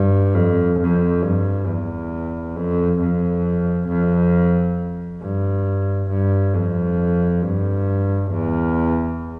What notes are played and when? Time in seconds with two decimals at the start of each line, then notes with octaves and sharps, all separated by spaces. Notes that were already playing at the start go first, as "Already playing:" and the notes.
Already playing: G2
0.34 F2
0.79 F2
1.23 G2
1.67 E2
2.55 F2
3.00 F2
3.88 F2
5.21 G2
6.09 G2
6.54 F2
7.42 G2
8.30 E2